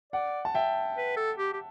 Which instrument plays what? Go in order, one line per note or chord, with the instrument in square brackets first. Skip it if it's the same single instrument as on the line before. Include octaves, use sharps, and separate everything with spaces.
[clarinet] D5 [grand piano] F#5
[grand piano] A5
E5 G5
[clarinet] B4
A4
G4
G4